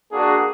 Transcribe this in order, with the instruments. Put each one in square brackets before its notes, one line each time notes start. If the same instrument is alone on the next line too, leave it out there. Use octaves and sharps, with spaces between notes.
[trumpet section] A#3 D4 F#4 G#4